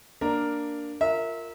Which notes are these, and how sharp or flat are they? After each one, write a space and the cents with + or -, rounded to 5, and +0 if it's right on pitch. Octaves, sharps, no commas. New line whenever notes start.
A#3 +0 D4 +0 A#4 +0
F4 +0 A#4 -15 E5 -25